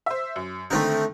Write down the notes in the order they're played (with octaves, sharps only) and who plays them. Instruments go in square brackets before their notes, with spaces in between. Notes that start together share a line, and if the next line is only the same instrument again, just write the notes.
[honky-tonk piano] C5 E5
F#2
[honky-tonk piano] D3 D#3 [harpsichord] A3 C4 D#4